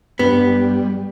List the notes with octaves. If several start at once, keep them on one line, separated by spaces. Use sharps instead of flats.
G2 G3 B3